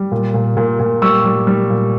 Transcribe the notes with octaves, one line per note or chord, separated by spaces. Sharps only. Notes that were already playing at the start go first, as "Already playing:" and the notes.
Already playing: G3
A#2
A#2
A#2
A#2
G3 C#6 E6
G3
G3
A#2